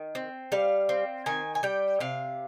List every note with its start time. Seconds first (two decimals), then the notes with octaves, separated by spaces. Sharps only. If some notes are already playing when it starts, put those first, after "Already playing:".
Already playing: D#3
0.15 C4
0.52 G3 F5
0.89 C4
1.26 D#3 G#5
1.55 G#5
1.63 G3 G5
2.00 C3 F5